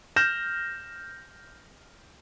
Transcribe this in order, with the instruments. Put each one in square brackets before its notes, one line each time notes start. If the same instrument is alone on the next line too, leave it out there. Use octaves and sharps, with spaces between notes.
[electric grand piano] F6 G6 A#6 E7